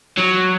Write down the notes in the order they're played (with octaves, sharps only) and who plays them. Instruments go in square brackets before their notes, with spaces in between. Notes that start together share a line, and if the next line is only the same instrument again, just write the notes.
[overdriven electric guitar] F#3